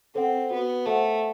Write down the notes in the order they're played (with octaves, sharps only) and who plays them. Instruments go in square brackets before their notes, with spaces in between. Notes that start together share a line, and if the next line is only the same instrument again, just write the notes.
[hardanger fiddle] C4 [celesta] A4 C5 F#5
[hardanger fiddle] B3 [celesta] F#4
[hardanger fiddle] A3 [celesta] A4 C5 F#5